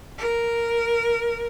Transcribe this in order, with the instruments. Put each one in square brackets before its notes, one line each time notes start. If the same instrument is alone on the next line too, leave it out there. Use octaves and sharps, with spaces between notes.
[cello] A#4